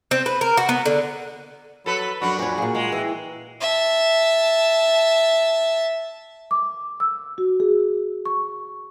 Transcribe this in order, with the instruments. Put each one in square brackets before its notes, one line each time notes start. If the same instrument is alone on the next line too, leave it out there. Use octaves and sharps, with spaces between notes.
[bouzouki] C4
B4
A#4
F#4
B3
D3
[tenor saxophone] F#3 [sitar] A4 B4 [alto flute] B5
[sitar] F#2 D4 [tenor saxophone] F#4
[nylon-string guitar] F2 C#5 [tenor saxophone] F#4 [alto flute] G#5
[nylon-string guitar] A#2 G#4 [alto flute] F5
[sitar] G#3
[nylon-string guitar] E3 [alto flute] G5
[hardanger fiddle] E5 A5
[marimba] D6
E6
F#4
G#4
C#6